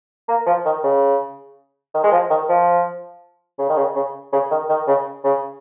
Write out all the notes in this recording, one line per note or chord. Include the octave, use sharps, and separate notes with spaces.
A#3
F3
D#3
C#3
D#3
G#3
F3
D#3
F3
C#3
D#3
C#3
C#3
C#3
D#3
D#3
C#3
C#3